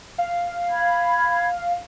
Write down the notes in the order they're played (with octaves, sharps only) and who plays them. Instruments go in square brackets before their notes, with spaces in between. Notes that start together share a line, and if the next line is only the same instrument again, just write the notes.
[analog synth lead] F5
[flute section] B5 G#6